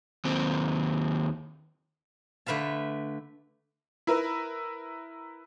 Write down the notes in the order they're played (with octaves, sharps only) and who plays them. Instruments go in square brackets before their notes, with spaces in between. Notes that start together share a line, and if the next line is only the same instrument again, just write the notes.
[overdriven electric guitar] D#2 C4
[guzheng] D3 A3 B4 F5 A5
[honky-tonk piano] E4 A#4 B4